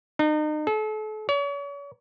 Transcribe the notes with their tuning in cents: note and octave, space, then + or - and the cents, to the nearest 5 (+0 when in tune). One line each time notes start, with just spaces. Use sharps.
D#4 -35
A4 -35
C#5 +40